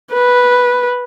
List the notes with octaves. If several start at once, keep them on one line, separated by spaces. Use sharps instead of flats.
B4